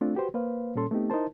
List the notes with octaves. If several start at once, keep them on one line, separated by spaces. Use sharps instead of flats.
A3 C4 D4 F4
F#4 G4 B4 C5
A#3 B4 C5 F5
A#2 G3 C#4 A4 C6
A3 B3 C4 D#4 G4
D#4 E4 A#4 C5 A5